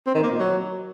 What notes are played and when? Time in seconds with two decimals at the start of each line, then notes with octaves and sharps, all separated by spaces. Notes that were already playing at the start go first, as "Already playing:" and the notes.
0.07 C4
0.15 D#3
0.23 A#3
0.31 A#2
0.39 F#3